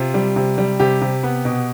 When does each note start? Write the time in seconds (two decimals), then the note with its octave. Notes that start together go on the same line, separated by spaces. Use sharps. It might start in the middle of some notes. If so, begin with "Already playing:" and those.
Already playing: C3 F4
0.14 G3
0.36 C3
0.58 G3
0.79 C3 G4
1.01 C3
1.23 B3
1.45 B2